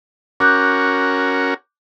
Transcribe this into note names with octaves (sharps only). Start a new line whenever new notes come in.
C#4 F#4 A#4 D6 F#6 G6